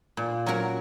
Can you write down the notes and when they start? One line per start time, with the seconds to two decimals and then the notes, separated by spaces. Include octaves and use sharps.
0.17 A#2
0.46 F#3 C#4 F#4 A#4